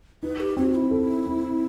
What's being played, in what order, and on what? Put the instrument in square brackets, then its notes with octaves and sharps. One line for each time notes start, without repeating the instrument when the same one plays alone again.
[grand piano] D#4 [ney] B4
[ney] G4
[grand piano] C4 [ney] F#4
[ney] E4
[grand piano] A4
C4